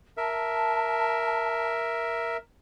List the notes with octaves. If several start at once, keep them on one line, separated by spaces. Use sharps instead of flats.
A#4 E5 A5